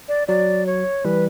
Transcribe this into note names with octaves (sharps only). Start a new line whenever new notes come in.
D5
F#3 D5
C#5
E3 G3 B4